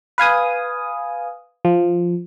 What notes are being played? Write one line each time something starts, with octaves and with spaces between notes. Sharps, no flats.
B4 F5 G#5 D#6
F3